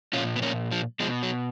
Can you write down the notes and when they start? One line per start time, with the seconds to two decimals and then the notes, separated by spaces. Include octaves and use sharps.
0.13 A#2 F3 C#4 F4
0.36 B3
0.42 A#3 C#4
0.71 F3
1.00 B2 F3 G#3
1.23 F#3